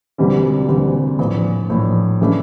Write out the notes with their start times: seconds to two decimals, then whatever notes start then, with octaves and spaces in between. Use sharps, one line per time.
0.18 E1 D2 C3 E3 G3
0.69 E1 D2 C3 E3 G3
1.19 A#1 A2 E3
1.70 A#1 A2 E3
2.21 C#3 E3 A3 D4